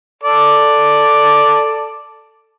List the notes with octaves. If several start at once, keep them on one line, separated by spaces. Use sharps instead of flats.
A4 D5